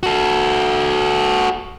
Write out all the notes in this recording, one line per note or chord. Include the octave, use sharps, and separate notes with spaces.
F#4 A4